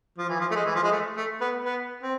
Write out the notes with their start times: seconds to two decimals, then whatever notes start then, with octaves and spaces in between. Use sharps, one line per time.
0.18 F3
0.29 E3
0.41 F3
0.51 A3
0.55 G#3
0.66 E3
0.75 F3
0.83 G#3
0.91 A3
1.17 A3
1.41 B3
1.65 B3
2.02 C4